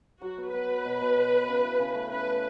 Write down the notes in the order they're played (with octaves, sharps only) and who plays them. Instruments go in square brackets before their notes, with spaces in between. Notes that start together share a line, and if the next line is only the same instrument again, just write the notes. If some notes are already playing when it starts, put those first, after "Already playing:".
[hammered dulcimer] F#3 [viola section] F#4
[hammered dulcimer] B3
[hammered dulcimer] B3 [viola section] B4
[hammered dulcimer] F#3
B2
B2
B2
A4
C#3
E4
C#3
A3
[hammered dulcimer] C#3 [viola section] B4
[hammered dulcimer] A3